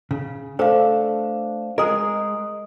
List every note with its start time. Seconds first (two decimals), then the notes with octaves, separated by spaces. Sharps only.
0.11 C#3
0.59 A3 D4 A4 C5 F5
1.78 G#3 G#4 A#4 D#5 D#6